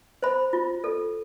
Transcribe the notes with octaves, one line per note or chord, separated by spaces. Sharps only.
C5 B5
F4
A4